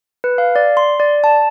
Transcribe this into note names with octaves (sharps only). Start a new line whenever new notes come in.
B4
F5
D5
C6
D5
A5